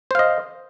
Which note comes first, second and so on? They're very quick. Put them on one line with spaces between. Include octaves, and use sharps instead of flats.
C5 F5 D#5